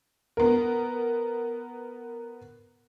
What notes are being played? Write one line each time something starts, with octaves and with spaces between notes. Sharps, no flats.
B3 A#4